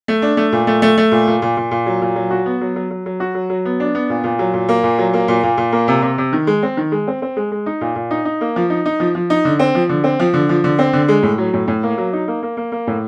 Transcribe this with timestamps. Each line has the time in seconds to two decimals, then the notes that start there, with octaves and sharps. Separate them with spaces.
0.08 A3
0.22 D4
0.37 A3
0.52 A#2
0.67 A3
0.82 A3
0.98 A3
1.12 A#2
1.27 A#2
1.42 A#2
1.57 A#2
1.71 A#2
1.86 F#3
2.02 A#2
2.16 F#3
2.31 F#4
2.46 B3
2.61 F#3
2.76 F#3
2.91 F#3
3.06 F#3
3.20 F#4
3.35 F#3
3.50 F#3
3.65 B3
3.80 D4
3.95 B3
4.10 A#2
4.24 A#2
4.39 F#3
4.54 A#2
4.69 A#3
4.83 A#2
4.99 F#3
5.13 A#3
5.28 A#2
5.43 A#2
5.58 A#2
5.72 A#3
5.88 C3
6.02 C3
6.18 C3
6.33 D#3
6.47 G#3
6.63 C4
6.77 D#3
6.92 G#3
7.07 C4
7.22 C4
7.37 G#3
7.51 G#3
7.66 D#4
7.81 A#2
7.96 A#2
8.11 D#4
8.25 D#4
8.41 A#3
8.56 F3
8.70 D#4
8.86 D#4
9.00 F3
9.15 F3
9.30 D#4
9.45 D3
9.59 C4
9.75 F3
9.89 D3
10.04 C4
10.20 F3
10.34 D3
10.49 F3
10.64 D3
10.79 C4
10.93 D3
11.08 G#3
11.23 A2
11.38 F#3
11.54 A2
11.68 A2
11.83 A#3
11.98 F#3
12.13 D#4
12.28 A#3
12.43 A#3
12.57 A#3
12.72 A#3
12.87 A2